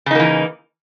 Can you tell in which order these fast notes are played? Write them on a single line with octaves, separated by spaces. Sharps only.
C#3 D#4 A#3 E3